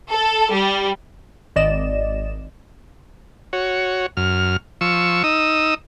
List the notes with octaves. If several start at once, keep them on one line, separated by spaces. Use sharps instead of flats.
A4
G3
G#1 D5 D#5 E7
F#4 C#5
F#2 F6
F3 C#6 E6
D#4 D#6 E6